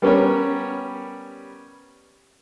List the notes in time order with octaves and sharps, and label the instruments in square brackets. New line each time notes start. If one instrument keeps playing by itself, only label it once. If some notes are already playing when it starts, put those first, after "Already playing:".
[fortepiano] G3 B3 C#4 A#4 C#5